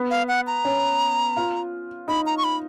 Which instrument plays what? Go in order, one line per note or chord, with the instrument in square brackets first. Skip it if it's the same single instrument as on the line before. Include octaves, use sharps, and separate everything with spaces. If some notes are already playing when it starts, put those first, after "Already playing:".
Already playing: [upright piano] B3
[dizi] F5
F#5
A#5
[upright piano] C#4
F4
[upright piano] D#4 [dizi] B5
[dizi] A#5
C#6
B5